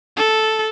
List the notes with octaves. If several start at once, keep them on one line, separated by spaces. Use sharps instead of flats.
A4